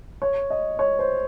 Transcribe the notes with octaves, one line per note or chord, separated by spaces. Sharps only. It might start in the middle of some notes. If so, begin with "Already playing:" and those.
C#5
D#5
C#5
C5